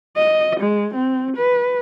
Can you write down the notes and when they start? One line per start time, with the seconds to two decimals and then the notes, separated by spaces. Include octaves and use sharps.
0.17 D#5
0.60 G#3
0.94 C4
1.37 B4